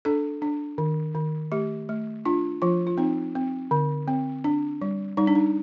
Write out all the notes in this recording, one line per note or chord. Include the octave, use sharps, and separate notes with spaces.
D4 A4
D4
D#3
D#3
A3 G4
A3
D4 F4
F3 F4
F4
C4 D#4
C4
D3
C4
D4
G3
G3 D#4
D4
D#4